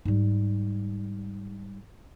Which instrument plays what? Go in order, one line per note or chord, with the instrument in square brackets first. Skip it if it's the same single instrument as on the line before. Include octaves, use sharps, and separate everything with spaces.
[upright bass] G#2 G3